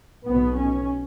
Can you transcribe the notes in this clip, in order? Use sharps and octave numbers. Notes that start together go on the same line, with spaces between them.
B1 B2 B3
C#4